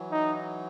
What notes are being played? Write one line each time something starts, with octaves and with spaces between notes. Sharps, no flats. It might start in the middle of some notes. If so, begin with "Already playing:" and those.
Already playing: E3 F#3
D#4